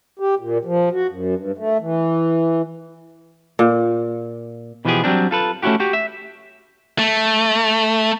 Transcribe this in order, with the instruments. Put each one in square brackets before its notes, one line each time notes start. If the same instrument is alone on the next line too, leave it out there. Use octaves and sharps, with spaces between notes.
[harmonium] G4
A#2
F3
F#4
F#2
G2
A3
E3
[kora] A#2
[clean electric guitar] B2 E3 F3 B3 G4 G#4
F#3 G3 C4 D4
F4 A4 B4
A3 C#4 D4 E4 F#4 G4
F#4 G4
E5
[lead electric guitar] A3